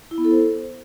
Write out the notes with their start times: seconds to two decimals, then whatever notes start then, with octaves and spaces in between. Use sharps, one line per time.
0.11 E4
0.18 B3
0.25 A4
0.31 C5